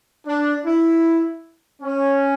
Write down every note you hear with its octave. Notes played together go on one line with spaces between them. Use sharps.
D4
E4
C#4